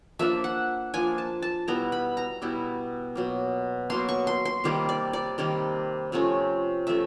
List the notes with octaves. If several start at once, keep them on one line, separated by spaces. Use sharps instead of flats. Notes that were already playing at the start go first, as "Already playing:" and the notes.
F3 A#3 D4 E5
F#5
F3 A#3 D4 G#5
A5
A5
B2 G3 B3 E4 A#5
B5
A#5
B2 G3 B3 E4
B2 F#3 A#3
B2 F#3 A#3 C6
C#6
C6
C6
C3 D#3 G3 A#3
D5
D5
C3 D#3 G3 A#3
C3 F3 A3 C#4
C3 F3 A3 C#4 E5